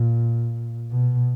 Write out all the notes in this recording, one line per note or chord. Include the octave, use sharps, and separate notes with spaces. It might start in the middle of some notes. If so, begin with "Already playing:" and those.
Already playing: A#2
B2